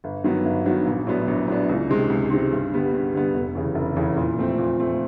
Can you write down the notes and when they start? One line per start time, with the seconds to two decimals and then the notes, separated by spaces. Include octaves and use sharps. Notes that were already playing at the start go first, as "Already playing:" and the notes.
0.04 G1
0.24 G2 D#3 F#3 B3
0.45 G1
0.66 G2 D#3 F#3 B3
0.87 A#1
1.07 A2 F#3 B3 D4
1.28 A#1
1.48 A2 F#3 B3 D4
1.69 C#2
1.90 C3 D#3 G#3
2.10 C#2
2.30 C3 D#3 G#3
2.52 G2
2.72 D3 G3 B3
2.93 G2
3.13 D3 G3 B3
3.34 F1
3.55 E2 C#3 E3
3.75 F1
3.96 E2 C#3 E3
4.17 A#2
4.38 F3 A3 C4
4.58 A#2
4.79 F3 A3 C4